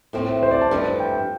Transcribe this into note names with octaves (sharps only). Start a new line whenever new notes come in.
A2 F3 A3 C4
C5
D5
A5
G2 F3 A3 E4
G5